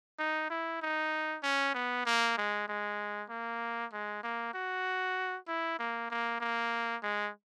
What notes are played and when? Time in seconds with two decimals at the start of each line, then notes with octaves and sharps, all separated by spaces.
0.19 D#4
0.50 E4
0.82 D#4
1.43 C#4
1.74 B3
2.06 A#3
2.38 G#3
2.68 G#3
3.30 A#3
3.93 G#3
4.23 A#3
4.54 F#4
5.48 E4
5.79 A#3
6.11 A#3
6.40 A#3
7.03 G#3